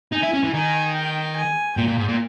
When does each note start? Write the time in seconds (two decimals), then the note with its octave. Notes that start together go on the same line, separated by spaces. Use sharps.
0.13 D#4 G#5
0.23 E4
0.34 C#4
0.44 E3
0.54 D#3 G#5
0.95 G5
1.36 G#5
1.77 A#2 G5
1.88 A#2
1.98 G#2
2.08 A#2